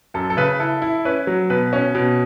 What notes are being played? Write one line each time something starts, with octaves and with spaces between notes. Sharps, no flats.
F#2 A4
A4
C#3 B4
E4 A4
E4
C#4 B4
F#3
B2 B4
C#4
B2